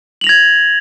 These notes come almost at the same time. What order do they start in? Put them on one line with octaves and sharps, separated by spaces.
F#7 F7 A#6 G#6